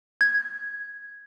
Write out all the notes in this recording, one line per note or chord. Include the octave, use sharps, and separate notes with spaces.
G#6